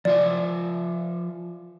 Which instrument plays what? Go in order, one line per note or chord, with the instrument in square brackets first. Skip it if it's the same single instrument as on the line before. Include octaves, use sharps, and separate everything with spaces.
[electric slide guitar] F3 F4 E5 [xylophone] D5